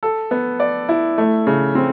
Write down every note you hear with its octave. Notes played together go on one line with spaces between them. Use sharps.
A4
B3
D5
E4
A3
C#3
C4